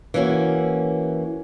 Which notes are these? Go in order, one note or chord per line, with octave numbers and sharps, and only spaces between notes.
E3 A#3 C#4 F#4